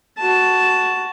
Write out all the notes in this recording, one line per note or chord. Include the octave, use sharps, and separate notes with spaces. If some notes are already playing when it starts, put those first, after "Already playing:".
F#4 A5